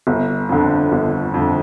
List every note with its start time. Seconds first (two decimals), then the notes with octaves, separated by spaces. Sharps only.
0.07 G1
0.49 F2 D3
0.92 G1
1.34 F2 D3